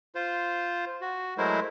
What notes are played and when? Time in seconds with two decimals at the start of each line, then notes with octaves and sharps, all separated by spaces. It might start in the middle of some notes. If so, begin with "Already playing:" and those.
0.15 F4 C5
1.01 F#4
1.38 F#3 G#3 A3 E4 A#4 C5